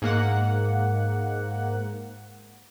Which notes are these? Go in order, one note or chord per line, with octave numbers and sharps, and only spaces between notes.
G#2 A#3 F#5